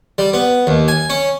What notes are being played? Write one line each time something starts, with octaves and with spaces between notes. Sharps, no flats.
G3
B3
D#2
G#5
C#4